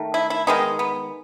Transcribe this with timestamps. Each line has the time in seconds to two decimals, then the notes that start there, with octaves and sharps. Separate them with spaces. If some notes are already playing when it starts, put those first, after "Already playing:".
Already playing: D#3 A3
0.14 E4
0.30 E4
0.47 D#3 G#3 B3 D#4
0.79 B3